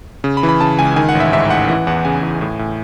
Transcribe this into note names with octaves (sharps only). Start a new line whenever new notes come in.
C#3
B5
E3
B5
C#3 A5
C#2 G#5
D#3 G#5
F#5
A1
E5
G#2 E5
A1 F#5
E3 F#5
E2 F#5
C#3 G#5
E2
A2
A2